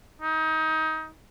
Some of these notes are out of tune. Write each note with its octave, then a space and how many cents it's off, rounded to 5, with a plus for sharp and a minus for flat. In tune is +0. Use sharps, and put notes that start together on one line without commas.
D#4 +25